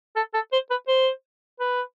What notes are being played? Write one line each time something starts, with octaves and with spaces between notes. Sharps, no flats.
A4
A4
C5
B4
C5
B4